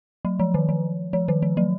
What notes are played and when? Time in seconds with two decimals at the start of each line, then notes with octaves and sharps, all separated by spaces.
0.25 F#3
0.40 F3
0.54 D#3
0.69 F3
1.13 F3
1.28 D#3
1.42 F3
1.57 F#3